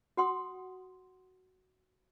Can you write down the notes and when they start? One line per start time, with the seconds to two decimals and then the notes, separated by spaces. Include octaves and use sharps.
0.17 F#4 F#5 C6 D#6